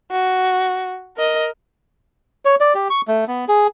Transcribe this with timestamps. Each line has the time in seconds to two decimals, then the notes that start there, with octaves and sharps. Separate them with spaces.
0.11 F#4
1.17 A#4 D#5
2.45 C#5
2.60 D5
2.75 G4
2.90 C#6
3.08 A3
3.28 B3
3.48 G#4